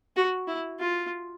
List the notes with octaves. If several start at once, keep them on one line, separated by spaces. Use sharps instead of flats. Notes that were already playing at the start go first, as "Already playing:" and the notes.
F#4
E4
F4